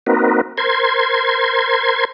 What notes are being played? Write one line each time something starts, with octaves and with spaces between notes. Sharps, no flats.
A#3 C4 D#4 F#4 A#4 B4
A#4 C5 C6 G#6